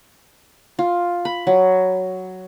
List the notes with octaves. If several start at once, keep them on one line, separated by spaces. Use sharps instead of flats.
F4
B5
F#3